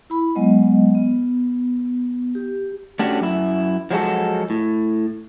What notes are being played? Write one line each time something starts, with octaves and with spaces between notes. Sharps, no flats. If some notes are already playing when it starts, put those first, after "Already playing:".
E4 B5
F#3 G#3 B3 D#5
B3
G4
A3 C#4 D4 F#4 G4
F#2 E4
F3 F#3 G#3 C#4 F#4 A4
A2